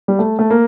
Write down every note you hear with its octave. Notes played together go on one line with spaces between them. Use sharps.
G3
A3
A3
A#3